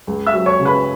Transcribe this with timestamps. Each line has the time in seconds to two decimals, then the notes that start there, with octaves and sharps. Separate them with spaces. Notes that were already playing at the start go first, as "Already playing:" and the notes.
0.07 C#2
0.26 E5 E6
0.33 F#3
0.46 C#5 C#6
0.60 C#3
0.65 B4 B5